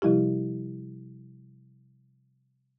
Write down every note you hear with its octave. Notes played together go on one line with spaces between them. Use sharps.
C3 F3 G3 E4 G4